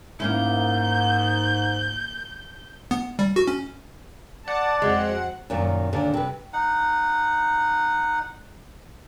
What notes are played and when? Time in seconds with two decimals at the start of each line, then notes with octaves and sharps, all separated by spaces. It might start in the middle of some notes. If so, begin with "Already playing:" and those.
0.20 G#2 A#3 C#4 E4 G6
2.91 B3
3.19 G3
3.36 F#4
3.47 C#4
4.48 D5 F#5 A5 D6
4.82 F2 F#3 G#3 C4
5.50 F#2 A#2 D#3
5.93 D#2 A#2 D3
6.13 C3 B4
6.53 D#4 F#5